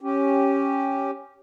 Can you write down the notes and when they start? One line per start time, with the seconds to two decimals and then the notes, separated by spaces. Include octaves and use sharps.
0.01 C#4 G4